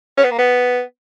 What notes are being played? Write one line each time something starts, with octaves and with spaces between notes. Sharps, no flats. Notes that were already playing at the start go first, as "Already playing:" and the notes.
C#4
B3
A#3
B3